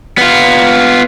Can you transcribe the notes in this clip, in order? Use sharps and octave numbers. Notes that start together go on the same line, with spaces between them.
B3 F4